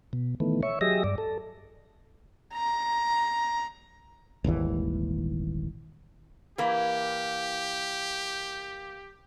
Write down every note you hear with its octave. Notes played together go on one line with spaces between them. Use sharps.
B2
D#3 E3 A3 B3
C#5 E5 C#6
F#3 G4 G#4 D#5 E5 A#6
G2 D5
A4
A#5
D#1 G#1 D#2 E3
E3 A#3 G4